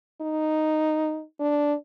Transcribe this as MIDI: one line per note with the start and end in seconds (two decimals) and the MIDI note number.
0.21 1.23 63
1.40 1.74 62